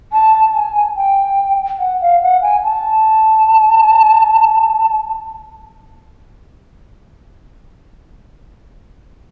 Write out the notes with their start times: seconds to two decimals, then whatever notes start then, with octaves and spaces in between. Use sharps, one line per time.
0.13 A5
0.54 G#5
0.97 G5
1.79 F#5
2.02 F5
2.22 F#5
2.42 G#5
2.63 A5